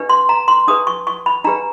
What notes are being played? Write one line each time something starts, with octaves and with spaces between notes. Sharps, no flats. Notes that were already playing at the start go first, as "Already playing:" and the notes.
Already playing: D4 G4 B4
C6
A#5
C6
D4 G4 B4 D#6
C#6
C#6
B5
D4 G4 B4 A#5